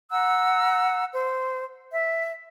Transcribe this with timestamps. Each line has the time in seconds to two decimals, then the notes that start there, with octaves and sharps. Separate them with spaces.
0.11 F#5 A#5 E6 F#6
1.13 C5
1.92 E5